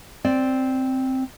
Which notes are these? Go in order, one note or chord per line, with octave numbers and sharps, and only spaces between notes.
C4 D5